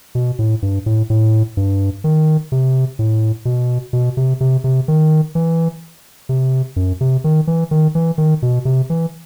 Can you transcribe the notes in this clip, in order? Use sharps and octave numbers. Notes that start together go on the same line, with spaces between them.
B2
A2
G2
A2
A2
G2
D#3
C3
A2
B2
B2
C3
C3
C3
D#3
E3
C3
F#2
C3
D#3
E3
D#3
E3
D#3
B2
C3
E3